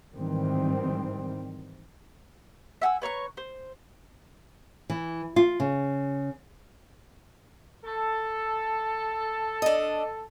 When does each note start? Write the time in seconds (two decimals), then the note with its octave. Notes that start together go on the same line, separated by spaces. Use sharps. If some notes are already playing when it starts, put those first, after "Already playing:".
0.13 G#2 D#3 E3 G3 C4
2.82 E5 F#5 G#5 E6
3.02 B4 C#5 A#5 C#6
3.37 C5
4.90 E3
5.36 F4
5.60 C#3
7.85 A4
9.62 D4 D#5